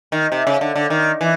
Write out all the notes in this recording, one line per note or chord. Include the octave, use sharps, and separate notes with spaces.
D#3
C3
C#3
D3
D3
D#3
E3